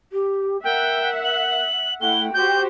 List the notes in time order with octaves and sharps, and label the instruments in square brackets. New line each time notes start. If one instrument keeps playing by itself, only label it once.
[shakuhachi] G4
[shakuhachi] A#4 [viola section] E5 F#5 [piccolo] G5
[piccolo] F#7
[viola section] A3 E4 F#5 [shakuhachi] G5 [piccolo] G7
[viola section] F#4 G4 C5 [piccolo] G6